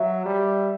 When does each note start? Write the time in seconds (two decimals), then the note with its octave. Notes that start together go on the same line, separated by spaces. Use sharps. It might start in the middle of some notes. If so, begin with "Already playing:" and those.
Already playing: F#3 E5
0.26 G3